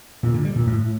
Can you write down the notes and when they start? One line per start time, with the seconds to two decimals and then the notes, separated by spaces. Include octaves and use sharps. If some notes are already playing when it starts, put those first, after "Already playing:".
0.23 A#2
0.34 D3
0.45 G3
0.56 A#2
0.66 A2